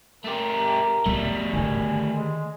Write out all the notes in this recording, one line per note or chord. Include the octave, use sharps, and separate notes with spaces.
A3 G4 A#4
F3 G3 A3 B3
D3 D#3 G#5
G#3